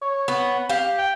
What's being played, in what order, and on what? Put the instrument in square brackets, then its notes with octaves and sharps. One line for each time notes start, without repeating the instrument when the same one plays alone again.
[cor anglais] C#5
[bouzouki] B3
G4 F5
[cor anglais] G5